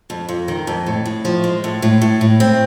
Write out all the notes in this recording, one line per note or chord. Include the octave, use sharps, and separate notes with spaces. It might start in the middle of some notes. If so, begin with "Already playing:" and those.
F2
F2
D#3
F2
A2
A2
F3
G#3
A2
A2
A2
A2
C4